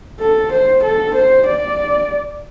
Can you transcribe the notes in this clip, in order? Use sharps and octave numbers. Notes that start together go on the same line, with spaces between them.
A4
C5
A4
C5
D5